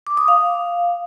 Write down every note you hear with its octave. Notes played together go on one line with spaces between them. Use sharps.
D6
D#6
F5